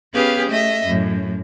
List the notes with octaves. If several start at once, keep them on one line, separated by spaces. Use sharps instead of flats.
B3 C#4 G4 G#4 B4 F5
A3 D#5 E5
F#2 A2